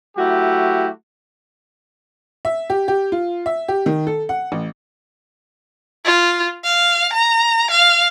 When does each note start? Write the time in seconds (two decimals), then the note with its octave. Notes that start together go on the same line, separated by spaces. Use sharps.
0.17 F#3 A3 E4 F#4 G4
2.45 E5
2.70 G4
2.88 G4
3.12 F4
3.46 E5
3.68 G4
3.86 D#3
4.07 A4
4.29 F#5
4.52 A1
6.05 F4
6.64 F5
7.13 A#5
7.71 F5